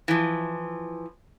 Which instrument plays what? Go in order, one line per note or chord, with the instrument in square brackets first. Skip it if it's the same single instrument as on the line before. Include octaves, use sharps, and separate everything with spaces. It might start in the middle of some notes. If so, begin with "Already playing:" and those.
[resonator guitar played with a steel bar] E3 F3